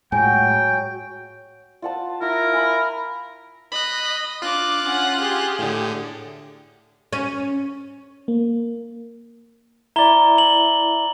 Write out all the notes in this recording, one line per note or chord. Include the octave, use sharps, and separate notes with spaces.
A2 F#3 G#3 G5 G#5
F4 F#5 A5
E4 F4 A#4
G#5 B5
D#5 B5 F#6
D4 F4 D6 F#6
C#4 F#5
G4 G#4
A2 D3
C#4
A#3
E4 D5 A#5 G7
F#7